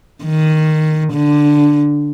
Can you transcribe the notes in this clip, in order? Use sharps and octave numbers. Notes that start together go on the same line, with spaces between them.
D#3
D3